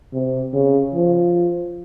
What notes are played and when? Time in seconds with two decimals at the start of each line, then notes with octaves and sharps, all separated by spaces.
0.13 C3
0.53 C#3
0.94 F3